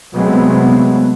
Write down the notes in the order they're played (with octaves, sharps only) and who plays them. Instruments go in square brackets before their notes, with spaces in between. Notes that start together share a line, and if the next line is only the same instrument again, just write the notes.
[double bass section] C3 F#3 G#3 A3 B3 C4